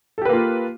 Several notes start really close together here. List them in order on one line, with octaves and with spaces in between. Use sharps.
A4 G4 B4 A#3 F4